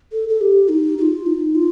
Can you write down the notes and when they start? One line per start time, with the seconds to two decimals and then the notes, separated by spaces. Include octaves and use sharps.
0.12 A4
0.29 A4
0.41 G4
0.69 D#4
0.98 G4
1.02 F4
1.26 D#4
1.55 F4